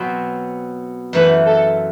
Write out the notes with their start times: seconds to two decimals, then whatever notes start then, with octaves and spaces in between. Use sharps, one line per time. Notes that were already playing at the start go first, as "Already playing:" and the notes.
Already playing: B2 F#3 C4
1.13 F#2 E3 A3 B4
1.46 A4